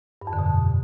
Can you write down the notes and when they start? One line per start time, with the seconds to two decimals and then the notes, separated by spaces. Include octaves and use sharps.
0.22 G2
0.27 F2
0.33 D3
0.39 B2